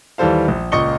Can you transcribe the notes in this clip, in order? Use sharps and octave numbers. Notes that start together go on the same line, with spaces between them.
D#2 E3 G3 A4 C5 F5
A#1
C#2 A#2 D#5 C#6 C#7 G7